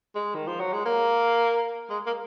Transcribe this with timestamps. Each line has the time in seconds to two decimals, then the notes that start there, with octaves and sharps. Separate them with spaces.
0.15 G#3
0.35 D#3
0.47 F3
0.60 F#3
0.73 G#3
0.85 A#3
1.90 G#3
2.07 A#3